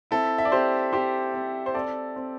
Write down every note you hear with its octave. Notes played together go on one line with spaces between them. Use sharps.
C4 E4 A4
E5
D5
C4 G4 C5
C4 G4 C5
C4
C5
C4 A4 D5
C4